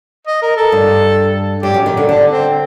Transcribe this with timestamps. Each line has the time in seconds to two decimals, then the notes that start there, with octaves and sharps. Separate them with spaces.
0.27 D#5
0.42 A#4
0.56 A4
0.72 G2
1.63 G2 G4
1.74 F#2
1.86 D#3
1.97 D3
2.09 D3 D4
2.31 C4